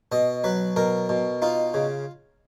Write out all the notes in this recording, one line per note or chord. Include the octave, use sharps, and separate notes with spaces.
B2 D#5
F#3 B4
B2 A#4
B2
D#4 F4
C#3